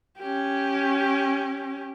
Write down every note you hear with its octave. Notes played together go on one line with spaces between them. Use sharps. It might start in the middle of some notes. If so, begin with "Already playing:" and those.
C#4 G4